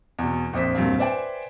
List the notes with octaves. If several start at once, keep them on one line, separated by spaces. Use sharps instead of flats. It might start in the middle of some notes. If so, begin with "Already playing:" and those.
E2 B2
A#1 F2 D4 C5 B6
E1 G2 A#2 C4 F5
B4 C5 D5 E5 G5 G#5